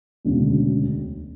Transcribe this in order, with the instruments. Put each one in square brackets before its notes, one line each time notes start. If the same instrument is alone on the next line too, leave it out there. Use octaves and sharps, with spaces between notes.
[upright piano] E1 D2 C#3